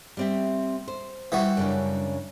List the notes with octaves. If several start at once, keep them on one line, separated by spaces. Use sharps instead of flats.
G3 C4 E5
C5
E3 G3 F#4
F#2 C#3 D4